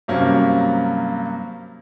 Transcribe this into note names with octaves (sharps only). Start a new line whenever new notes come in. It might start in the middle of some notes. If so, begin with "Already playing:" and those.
G2 C3 F#3 A#3 C#4